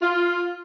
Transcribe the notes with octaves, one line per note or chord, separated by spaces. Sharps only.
F4